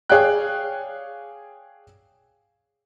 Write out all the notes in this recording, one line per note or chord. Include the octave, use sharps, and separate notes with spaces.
G#4 C#5 D5 F5 G5 F#6